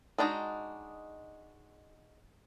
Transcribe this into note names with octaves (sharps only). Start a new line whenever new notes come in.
G#3 D4 D#4 F#4